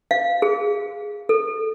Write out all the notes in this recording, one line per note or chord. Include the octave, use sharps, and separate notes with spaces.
F5
G#4
A4